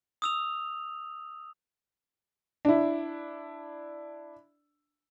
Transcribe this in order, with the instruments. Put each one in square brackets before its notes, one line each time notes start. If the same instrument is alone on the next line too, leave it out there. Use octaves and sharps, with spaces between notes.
[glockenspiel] D#6 E6 F7
[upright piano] D4 E4